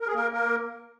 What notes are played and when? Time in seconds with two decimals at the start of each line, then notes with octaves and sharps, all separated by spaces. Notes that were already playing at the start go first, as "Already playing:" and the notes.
0.01 A#4
0.07 G#4
0.15 A#3 A#4
0.33 A#3 A#4